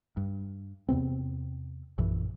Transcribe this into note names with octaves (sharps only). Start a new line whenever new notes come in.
G2
E2 C3 B3 C4
A#1 F#2 E3